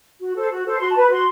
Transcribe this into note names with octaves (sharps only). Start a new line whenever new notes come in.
F#4
A4 C5
F#4
A4 C5
F#4 C6
A5
B4 B5
F#4 C6